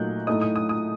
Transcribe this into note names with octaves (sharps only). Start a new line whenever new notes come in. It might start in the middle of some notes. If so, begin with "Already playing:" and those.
Already playing: A#2 F#3 A3 D#4 F#6 G6
A2 A3 D#4 D#6
D#6
D#6
D#6